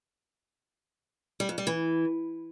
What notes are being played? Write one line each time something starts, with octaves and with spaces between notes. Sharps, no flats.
G3
F2
G3
E3